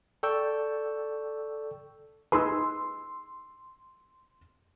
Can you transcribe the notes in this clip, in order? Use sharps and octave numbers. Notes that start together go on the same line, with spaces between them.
A4 D5 G5 C#6 E6 G6
D#4 G#4 B4 C6 E6